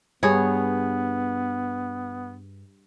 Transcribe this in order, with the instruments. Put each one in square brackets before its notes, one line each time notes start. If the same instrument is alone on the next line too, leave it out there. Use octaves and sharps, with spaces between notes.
[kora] G2 G#4 C#5 [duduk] B3